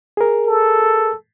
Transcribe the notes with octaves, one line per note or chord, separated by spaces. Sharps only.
G#4 A#4
A4